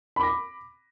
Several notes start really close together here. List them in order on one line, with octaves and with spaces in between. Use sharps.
B5 D6 A#6